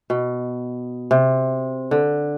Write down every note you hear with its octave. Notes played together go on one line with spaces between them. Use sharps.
B2
C3
D3